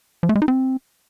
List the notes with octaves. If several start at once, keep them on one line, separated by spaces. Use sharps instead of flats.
F3
A3
G#3
D#4
C4